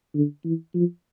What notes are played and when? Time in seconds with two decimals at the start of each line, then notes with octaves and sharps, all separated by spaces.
0.15 D3
0.45 E3
0.75 F3